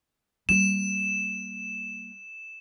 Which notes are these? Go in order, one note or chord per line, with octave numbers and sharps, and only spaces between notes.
G3 A#3 E7